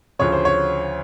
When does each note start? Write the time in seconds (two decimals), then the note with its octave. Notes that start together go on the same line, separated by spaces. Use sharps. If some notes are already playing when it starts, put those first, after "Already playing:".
0.19 D2 C#3 F3 C#5
0.32 C5
0.45 C#5